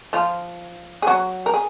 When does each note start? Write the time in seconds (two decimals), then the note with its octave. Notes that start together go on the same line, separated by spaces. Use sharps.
0.13 F3 F4
1.02 G#4
1.07 F#3 F#4
1.46 A#4
1.54 G#4